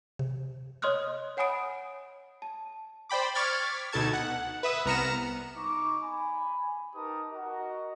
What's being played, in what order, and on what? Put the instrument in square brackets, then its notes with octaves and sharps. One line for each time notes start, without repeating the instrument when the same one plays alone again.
[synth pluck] C3
[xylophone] C#5 D#5 C6 D#6 F6 F#6
C#5 F#5 G#5 B5 D#6 D7
A5
[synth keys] C5 D5 G5 B5 D6
C#6 D6 F6 G#6 A6 B6
D2 B2 D#4 A4 A5 G#6
F#5
B4 E5 D#6
C2 B3 A#5 F6 C#7 E7
[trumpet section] D#4 C#6 D6
G#5 B5
D#4 G4 A#4 B4 A5 D#6
F#4 A#4 D#5